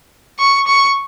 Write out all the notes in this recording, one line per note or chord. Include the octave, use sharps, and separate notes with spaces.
C#6
C#6